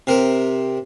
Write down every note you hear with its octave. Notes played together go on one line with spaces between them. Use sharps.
C3 A#4